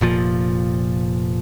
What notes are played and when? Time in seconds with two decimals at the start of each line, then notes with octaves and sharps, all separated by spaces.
0.01 F1 A#2 F3